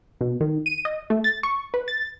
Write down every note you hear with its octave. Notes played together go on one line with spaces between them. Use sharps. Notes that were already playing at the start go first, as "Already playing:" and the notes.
B2
D#3
D#7
D#5
A3
A6
C#6
B4
A6